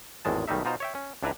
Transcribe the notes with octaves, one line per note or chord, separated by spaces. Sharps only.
G#1 E2 A2 G#3 A5
B1 D#3 G3 A3 D#4 E5
B2 D#4 F4 C5 A#5
C#5 E5 G5
C#4
C#2 D4 E4 B4 E5 A#5